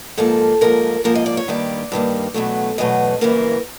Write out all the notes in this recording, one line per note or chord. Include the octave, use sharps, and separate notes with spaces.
G#2 F3 A#3 A4
G#2 F3 A#3 A#4
G#2 F3 A#3 A#4
D#5
D5
C#5
G2 D#3 G3 A#3 D5
G2 D#3 G3 A#3
E2 B2 F#3 A3
E2 B2 F#3 A3 D#5
F#2 C#3 E3 G3 A#3 A#4